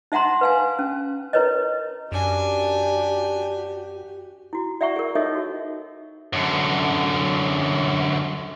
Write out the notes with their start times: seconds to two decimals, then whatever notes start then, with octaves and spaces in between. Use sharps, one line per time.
0.12 D#4 E5 F#5 A#5 C6
0.41 B4 F5 G#5
0.79 C#4
1.33 E4 A#4 B4 C#5 D#5
2.12 F#2 D4 F#4 G4 G#5
4.53 E4 F#4
4.81 D5 E5 F#5 A#5 C#6
4.96 G#4 A#4
5.15 D#4 F4 A4 C#5 D#5 E5
5.35 F#4
6.33 F#2 D3